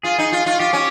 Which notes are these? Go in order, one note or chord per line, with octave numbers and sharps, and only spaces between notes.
F4 G#4
D#4
F4
F4
F4 G4
C#4